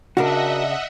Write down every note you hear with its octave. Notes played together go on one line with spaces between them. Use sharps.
C#3 D4 F#4 A#4 D#5 E5 F#5